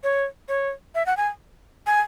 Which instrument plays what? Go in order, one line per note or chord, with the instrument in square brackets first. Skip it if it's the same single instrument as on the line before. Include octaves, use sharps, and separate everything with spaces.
[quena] C#5
C#5
E5
F#5
G#5
G#5